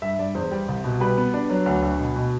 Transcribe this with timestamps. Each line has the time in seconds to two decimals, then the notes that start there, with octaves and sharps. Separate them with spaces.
0.02 G2 E5
0.19 G2 D5
0.35 E2 C5
0.52 G3
0.68 C2
0.84 B2
1.00 G3 B4
1.18 B3
1.34 D4
1.50 F#3
1.66 D2
1.83 D2
1.99 B2
2.16 B2